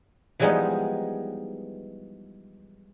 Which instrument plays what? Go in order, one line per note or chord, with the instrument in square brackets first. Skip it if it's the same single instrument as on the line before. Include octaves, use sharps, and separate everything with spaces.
[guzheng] E3 F3 G3 G#3 B3 D#4